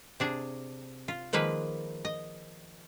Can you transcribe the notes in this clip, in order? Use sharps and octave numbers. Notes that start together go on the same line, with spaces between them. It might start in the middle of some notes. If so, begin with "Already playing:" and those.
C3 D4 G#4
F4
D#3 F3 G#3 A#3 B4
D#5